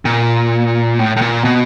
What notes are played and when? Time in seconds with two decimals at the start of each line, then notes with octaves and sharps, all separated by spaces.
0.05 A#2
0.99 A2
1.16 A2
1.21 A#2
1.45 B2